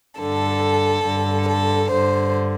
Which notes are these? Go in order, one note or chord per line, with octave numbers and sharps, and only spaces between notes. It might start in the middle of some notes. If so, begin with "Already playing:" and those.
G2 D3 A4
G2 D3
A4
G2 D3 C5